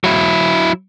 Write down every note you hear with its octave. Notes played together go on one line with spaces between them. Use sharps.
F#3 E4